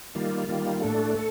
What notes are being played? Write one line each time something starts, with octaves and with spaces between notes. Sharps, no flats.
D#3 G3 A#3 F4
D#3 G3 A#3 F4
A2 A3 D4 A4
A4